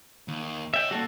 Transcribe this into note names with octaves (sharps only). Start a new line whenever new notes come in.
D#2
C#5 D#5 E5 G5
G3 A#3 F#4 A4